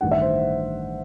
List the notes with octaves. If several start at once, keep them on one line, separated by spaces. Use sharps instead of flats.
A1 G2 D#3 F#5
E5
C5